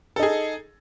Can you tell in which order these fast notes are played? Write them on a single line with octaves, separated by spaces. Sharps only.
A4 D#4 G#4